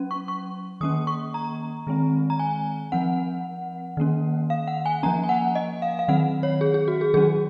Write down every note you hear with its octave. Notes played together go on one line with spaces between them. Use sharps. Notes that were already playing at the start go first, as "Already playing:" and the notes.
Already playing: F#3 C#4
C#6
C#6
D#3 A#3 C#4 D#6
C#6
A#5
D#3 G#3 C4
A#5
G#5
F3 C4 F#5
D#3 A#3 C#4
F5
F#5
G#5
F3 A#3 C#4 A#5
G#5
F#5
D#5
F5
F5
D#3 F#3 C4 F#5
C#5
G#4
G#4
F#4
G#4
D#3 F#3 C#4 G#4